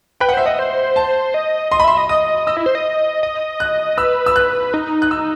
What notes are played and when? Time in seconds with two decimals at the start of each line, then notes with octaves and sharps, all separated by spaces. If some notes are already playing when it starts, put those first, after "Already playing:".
0.20 B4 G5
0.29 F#5
0.33 C5 E5
0.46 D#5 F#5
0.59 C5
0.96 A5
1.34 D#5
1.71 D#5 C6
1.80 B5
1.84 E5 C6
1.97 D#5
2.09 D#5 D#6
2.47 D#5 E6
2.57 E4
2.66 C5
2.75 D#5
3.23 D#5
3.60 F#6
3.97 B4 E6
4.26 E6
4.36 F#6
4.74 D#4
5.02 F#6
5.11 E6